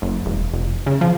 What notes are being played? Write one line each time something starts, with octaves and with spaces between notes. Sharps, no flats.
F#1
E1
F1
C#3
F3